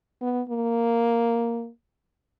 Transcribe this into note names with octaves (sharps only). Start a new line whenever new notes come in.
B3
A#3